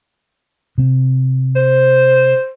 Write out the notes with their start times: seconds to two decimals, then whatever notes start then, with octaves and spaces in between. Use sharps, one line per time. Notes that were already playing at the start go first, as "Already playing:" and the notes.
0.78 C3 C4
1.56 C5